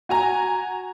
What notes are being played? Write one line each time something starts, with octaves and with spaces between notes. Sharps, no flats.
F#4 G#5 A#5